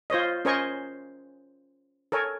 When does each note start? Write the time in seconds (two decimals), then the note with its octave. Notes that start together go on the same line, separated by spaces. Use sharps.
0.10 F4 C5 C#5 D#5
0.45 C#4 A#4 C5 D#5 G#5 C#6
2.12 A4 A#4 C#5 G#5